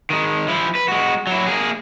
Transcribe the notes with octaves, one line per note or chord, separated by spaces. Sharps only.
D#3 G#3
F3 E4
B4
G#3 F#4
F#3 E4
A#3 G#4